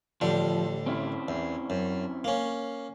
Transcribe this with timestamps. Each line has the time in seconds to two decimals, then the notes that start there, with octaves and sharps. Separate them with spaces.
0.21 A1 D3 F3 G3
0.86 C4 C#4 E4
1.28 E2
1.70 F#2
2.24 A#3 C#4